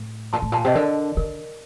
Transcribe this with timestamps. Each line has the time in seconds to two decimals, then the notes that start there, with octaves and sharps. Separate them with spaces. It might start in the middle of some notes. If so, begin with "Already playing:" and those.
Already playing: A2
0.33 A#2 A5 C6
0.42 A2
0.52 A#2 A5 C6
0.65 C3 D#5
0.75 D3 A#4 D5
1.17 D3 A#4